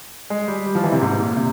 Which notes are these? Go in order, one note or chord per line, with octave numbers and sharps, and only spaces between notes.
G#3
G3
G3
F3
E3
C3
G#2
A#2
C3